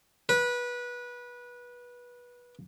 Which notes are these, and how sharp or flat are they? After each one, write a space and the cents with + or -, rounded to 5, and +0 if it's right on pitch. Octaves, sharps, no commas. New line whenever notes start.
B4 -20